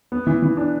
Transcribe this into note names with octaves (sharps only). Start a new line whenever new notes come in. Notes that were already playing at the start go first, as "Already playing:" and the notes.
B3
E3
E3
D4